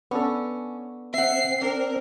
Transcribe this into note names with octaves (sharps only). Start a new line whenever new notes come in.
B3 C#4 D4 A4
C4 E5 F#5 C7
D4 A#4